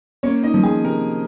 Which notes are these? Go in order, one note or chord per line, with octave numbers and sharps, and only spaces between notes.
A#3 C#4 C#5
D#4 D#5
F3
G#4 G#5
C3 A#4